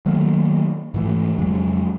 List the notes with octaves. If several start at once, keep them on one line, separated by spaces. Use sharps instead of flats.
D#3 F#3 A3 A#3
G#2 E3 A3
F2 C#3 F#3 G#3